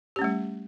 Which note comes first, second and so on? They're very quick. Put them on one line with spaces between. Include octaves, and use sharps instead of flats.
G4 C#4 A3 G3